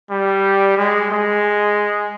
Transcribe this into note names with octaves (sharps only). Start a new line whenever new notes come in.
G3
G#3
G#3